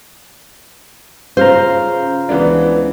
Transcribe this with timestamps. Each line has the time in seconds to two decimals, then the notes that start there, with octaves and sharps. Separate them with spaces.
1.37 C#3 F4 C5 F5 A#5
2.29 C#2 E3 B3 D4